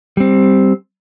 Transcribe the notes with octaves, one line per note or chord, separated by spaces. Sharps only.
G3 C4